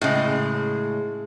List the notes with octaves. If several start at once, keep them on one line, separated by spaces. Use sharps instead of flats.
A2 C#3 G#3